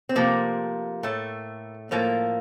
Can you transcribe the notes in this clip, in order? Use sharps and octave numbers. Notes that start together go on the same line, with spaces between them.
C4
C3 F3 A3 A#3
A2 A3
A2 F3 A3 A#3